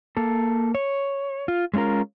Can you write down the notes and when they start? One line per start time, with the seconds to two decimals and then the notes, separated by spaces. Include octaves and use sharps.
0.17 A#3 A4
0.75 C#5
1.48 F4
1.74 G#3 A3 C#4 F4 A#4